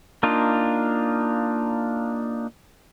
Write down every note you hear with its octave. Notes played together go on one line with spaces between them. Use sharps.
A#3 D4 D#4 F4